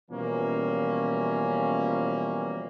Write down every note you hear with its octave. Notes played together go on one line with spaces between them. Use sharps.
B2 E3 F3 G3 A#3 C#4